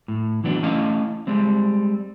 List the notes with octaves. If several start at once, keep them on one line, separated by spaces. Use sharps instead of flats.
A2
E3 F#3 B3 D4
A3 C#4 E4 D#5 F5
G3 G#3 C4